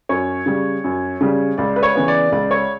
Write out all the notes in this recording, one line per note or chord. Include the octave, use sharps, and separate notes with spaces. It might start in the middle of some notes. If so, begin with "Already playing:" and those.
F#2 C#5
C#3 G3
F#2
C#3 G3
C#2 D5
B4
C#5
C#3 E3 B3
D5
C#2 D5
C#5